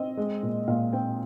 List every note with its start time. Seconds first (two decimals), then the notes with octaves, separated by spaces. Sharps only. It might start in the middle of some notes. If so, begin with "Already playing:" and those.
Already playing: C4 D#5
0.17 G#3
0.43 A#2
0.68 A#2 F5
0.93 C4 G5